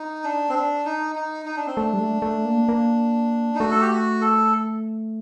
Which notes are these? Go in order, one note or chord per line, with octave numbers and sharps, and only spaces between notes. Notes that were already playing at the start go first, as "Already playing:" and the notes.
Already playing: D#4
D4
C4
D4
D#4
D#4
D#4
D4
C4
A3 D4
G3
A3
A3
A#3
A#3
D#4
A3 F#4
A4
G4
F#4
A4